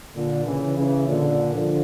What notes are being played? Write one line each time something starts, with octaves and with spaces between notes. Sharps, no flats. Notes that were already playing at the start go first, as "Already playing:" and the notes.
A#2 D3
C#3 E3
C#3 E3
A#2 D3
D3 F3